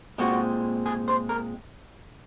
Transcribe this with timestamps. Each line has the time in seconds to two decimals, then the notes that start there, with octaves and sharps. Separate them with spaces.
0.18 A#2 G#3 C4 F#4
0.86 G#4
1.08 C5
1.29 A#4